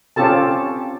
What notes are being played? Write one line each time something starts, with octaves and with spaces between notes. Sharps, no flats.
C4 C#4 F4 G4 A4 A5